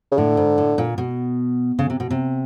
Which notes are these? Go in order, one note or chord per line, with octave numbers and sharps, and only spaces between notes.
C#3
A2 D3
G#2
A2
A#2
B2
C#3
C3
B2
C3